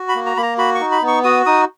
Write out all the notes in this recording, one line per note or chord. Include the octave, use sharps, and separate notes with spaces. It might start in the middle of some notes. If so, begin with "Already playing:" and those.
Already playing: F#4
B5
A#3
A#5
A#3 B5
A#5
F#4 B5
C#6
D#4
B5
B3
C#6
F#4 D#6
D#4 D#6